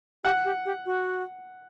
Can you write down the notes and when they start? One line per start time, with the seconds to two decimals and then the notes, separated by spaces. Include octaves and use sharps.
0.24 G4 F#5
0.45 G4
0.65 G4
0.86 F#4